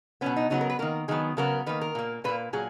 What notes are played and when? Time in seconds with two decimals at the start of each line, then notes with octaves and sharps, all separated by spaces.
0.21 B2 F#3 B3 C#4
0.36 D#4
0.50 C#3 F#3 B3 D#4
0.61 A#4
0.70 B4
0.79 D#3 A#3 A#4
1.08 D#3 F#3 B3 G#4
1.37 C#3 F#3 B3 A#4
1.66 D#3 A#3 B4
1.81 A#4
1.95 A#2 A#3
2.24 A#2 A#3 B4
2.53 A#2 F#3 G#4